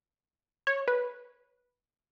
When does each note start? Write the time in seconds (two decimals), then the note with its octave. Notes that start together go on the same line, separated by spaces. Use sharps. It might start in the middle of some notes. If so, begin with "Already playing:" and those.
0.67 C#5
0.88 B4